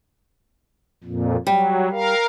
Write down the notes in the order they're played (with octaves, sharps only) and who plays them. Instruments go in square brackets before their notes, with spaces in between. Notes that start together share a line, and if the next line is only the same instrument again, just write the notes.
[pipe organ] F2 A#2
[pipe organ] F#3 [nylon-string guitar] G3
[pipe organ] A#4 F5